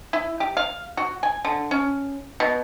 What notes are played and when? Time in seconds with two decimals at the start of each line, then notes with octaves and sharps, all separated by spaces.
0.13 E4
0.40 G4
0.57 F5
0.97 F#4
1.23 G#5
1.45 D3
1.71 C#4
2.40 B2